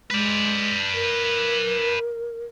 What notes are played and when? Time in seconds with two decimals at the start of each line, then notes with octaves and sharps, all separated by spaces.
0.10 G#3 B4 D5
0.94 A#4